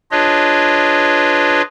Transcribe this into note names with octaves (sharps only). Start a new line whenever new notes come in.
D4 F4 G#4 B4 C#5 D#5